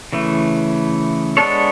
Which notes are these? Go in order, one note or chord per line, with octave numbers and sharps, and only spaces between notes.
C#3 E3 A3
G#3 B3 D4 A4 C#5